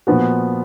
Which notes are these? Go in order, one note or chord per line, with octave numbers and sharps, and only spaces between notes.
A#2 F3 B3 F#4